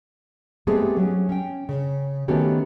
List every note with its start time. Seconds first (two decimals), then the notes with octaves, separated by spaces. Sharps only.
0.67 G#3 A3 B3 C4 G4 G#4
0.97 F#3 C#4
1.29 C#4 G5
1.69 C#3
2.28 D#3 A3 B3 C#4 F#4 G4